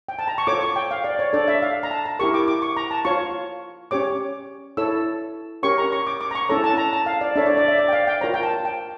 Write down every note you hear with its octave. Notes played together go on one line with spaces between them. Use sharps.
G5
A5
A#5
C#6
F4 A4 C#5 D6
C#6
G5
F5
D5
C#5
D4 A4 C#5 D5
E5
F5
A#5
A5
A#5
E4 G4 A#4 C#6
D6
D6
C#6
A#5
A5
F4 C#5 C#6
C#4 G4 C#5 D6
E4 A4 C#5 E6
C#4 G4 A#4 C#5 C#6
A#5
C#6
D6
D6
A#5
C#6
C#4 E4 A4 C#5 A#5
A5
A#5
A5
F5
D5
D4 A4 C#5 E5
D5
D5
E5
D5
G5
F5
G5
F4 A#4 C#5 A#5
G5
A5
G5